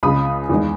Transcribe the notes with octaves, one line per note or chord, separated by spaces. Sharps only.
C#2 C#3 G#3 B5 D#6
E2 D#3 G#3